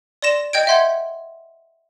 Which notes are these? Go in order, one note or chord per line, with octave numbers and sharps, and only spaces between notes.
D5 C6 A#6 E7
D#5 G5 G6 G#6 D7
E5 F#5 C6 G6 G#6